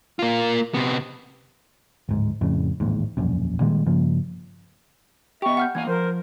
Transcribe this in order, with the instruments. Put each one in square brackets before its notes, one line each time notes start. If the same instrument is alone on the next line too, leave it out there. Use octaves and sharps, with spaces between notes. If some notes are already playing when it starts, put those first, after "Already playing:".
[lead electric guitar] A#3 F4
C3 B3
[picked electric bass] D1 G#2
F2 A2 C#3
A1 D#2 G#2
E1 A#1 F#2
A#2 D#3 G3 G#3
G2 C#3 F3 A#3
[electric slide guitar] B3 G4 [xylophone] D#5 G5 [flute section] E5 C#6
[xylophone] F#5 F6 G6
[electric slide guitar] E3 A#3 F5 [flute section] G#5 [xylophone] G#6
[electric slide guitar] F3 [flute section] A#4 C5